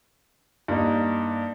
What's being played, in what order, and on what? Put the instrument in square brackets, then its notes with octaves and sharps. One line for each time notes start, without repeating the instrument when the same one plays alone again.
[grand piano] G2 A#3 D#4